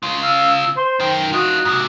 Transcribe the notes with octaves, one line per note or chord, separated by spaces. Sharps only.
C#3 F4 C6
F5 E6
C5 C6
F#2 D#3 G5
D#4 F4 F#4 D#6
G#2 C3